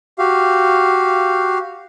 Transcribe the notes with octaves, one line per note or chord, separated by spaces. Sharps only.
F#4 G4 F5